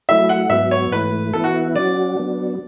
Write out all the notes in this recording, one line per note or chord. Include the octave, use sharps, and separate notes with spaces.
F#3 A3 E4 E5
F#5
G#2 F#3 B3 E5
C#5
G#2 E3 A3 B4
E3 B3 E4 A4
F#4
F#3 C#4 F#4 D5
F#3 B3 D4